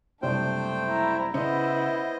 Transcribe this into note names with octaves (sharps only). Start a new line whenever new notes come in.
F#1 C2 A3 D4 C5 D5 G5
E4 A#5
C#3 B3 C#4 E4 C5 D5 D#5